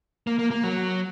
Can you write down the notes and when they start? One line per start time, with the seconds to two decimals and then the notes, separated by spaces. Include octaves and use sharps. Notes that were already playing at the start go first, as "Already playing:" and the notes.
0.27 A#3
0.39 A#3
0.51 A#3
0.64 F#3